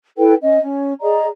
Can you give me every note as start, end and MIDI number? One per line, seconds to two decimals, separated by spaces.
0.18 0.34 64
0.18 0.34 69
0.18 0.34 71
0.18 0.34 79
0.41 0.60 61
0.41 0.60 75
0.61 0.92 61
1.01 1.26 68
1.01 1.26 74
1.01 1.26 75
1.01 1.26 82